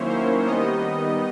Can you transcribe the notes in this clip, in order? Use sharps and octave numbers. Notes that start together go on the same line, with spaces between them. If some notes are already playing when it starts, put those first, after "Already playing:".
Already playing: D#3 F#3 A#3 C#4 E4 C5 C#5
C5
D#3 G3 B3 D#4 D#5